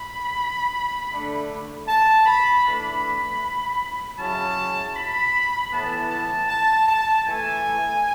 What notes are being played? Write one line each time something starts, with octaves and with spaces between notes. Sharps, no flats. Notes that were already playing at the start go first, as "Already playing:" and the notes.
Already playing: B5
D3 A3 D4
A5
B5
E3 A3 D4 B5
C#3 F#3 C#4 E4 A5
B5
A2 E3 B3 E4 A5
A5
A5
A5
E3 A3 E4 G#5